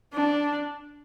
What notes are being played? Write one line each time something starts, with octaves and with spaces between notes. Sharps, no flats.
D4